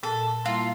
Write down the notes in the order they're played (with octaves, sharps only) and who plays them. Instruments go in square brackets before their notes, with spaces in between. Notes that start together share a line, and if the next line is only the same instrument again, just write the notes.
[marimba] A#2 [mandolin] A4
[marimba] G3 A#3 E4 [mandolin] F4